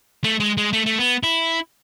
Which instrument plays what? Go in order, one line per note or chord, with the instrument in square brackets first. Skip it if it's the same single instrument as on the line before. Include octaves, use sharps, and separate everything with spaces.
[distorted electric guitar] A3
G#3
G#3
A3
A3
B3
E4